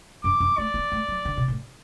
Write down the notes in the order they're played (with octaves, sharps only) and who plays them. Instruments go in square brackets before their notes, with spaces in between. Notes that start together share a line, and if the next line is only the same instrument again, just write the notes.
[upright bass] F#2 [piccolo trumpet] D6
[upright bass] F#2
[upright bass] A3 [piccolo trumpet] D5
[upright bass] B3
A3
F#3
D3
B2
A2